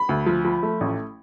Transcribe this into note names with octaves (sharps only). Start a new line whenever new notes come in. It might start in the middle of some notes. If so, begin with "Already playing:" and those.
Already playing: B5
D2
F3
F3
A3
A1